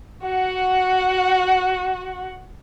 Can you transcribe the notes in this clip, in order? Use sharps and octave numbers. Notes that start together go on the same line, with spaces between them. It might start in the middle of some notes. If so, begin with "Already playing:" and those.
F#4 F#5